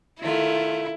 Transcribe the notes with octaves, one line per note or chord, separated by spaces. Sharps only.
D#3 A3 E4 F4